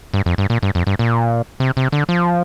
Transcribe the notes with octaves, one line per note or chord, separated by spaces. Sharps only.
G2
F2
G2
A#2
G2
F2
G2
A#2
C3
C3
D3
F3